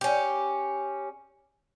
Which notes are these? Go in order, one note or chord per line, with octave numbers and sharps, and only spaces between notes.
C#4 G4